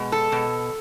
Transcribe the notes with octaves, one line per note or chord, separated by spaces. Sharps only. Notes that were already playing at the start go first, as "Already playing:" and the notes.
Already playing: B2 G#3
A4
B2